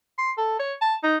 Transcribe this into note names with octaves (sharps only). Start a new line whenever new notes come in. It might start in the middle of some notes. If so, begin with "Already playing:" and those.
C6
A4
C#5
A5
D#4